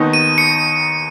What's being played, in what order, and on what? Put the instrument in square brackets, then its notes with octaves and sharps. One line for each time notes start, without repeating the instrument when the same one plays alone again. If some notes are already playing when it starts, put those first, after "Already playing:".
Already playing: [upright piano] D#2 D#3 B3 D#4
[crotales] D#7
C#7